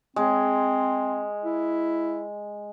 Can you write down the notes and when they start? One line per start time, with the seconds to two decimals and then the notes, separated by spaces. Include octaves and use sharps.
0.16 G#3 C4
1.45 E4